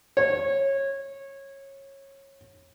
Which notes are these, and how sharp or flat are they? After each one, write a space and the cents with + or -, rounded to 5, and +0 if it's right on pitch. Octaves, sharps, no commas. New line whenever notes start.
C#5 -20